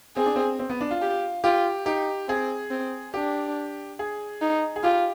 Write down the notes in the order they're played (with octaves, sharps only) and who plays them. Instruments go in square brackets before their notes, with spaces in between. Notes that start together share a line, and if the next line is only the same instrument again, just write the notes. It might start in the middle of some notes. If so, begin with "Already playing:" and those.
[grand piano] C4 [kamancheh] G#4
[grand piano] D4
C4
C4
B3
D4
F4
[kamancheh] G4
[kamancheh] F4 [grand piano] G4
[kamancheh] D#4 [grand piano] G4
[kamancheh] C4 [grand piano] G#4
[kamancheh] C4
[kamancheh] D4 [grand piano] G4
[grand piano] G#4
[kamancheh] D#4
[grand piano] G#4
[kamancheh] F4 [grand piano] G4